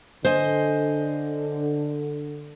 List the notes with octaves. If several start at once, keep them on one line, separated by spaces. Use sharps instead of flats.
D3 C5 D#5 G#5